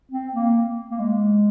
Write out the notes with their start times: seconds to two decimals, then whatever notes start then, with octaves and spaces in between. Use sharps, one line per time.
0.12 C4
0.34 A#3
0.91 A#3
1.00 G#3